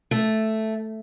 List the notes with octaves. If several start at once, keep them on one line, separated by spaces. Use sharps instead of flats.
A3